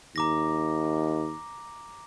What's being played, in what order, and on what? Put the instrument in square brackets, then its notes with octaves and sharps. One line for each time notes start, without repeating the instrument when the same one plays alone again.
[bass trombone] D#2 [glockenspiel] A#5 D6 A#6